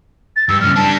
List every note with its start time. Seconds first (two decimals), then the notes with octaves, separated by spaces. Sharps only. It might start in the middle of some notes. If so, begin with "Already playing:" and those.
0.36 A6
0.49 G2 E6
0.61 G2 C#3 F6
0.76 G3 D4 A5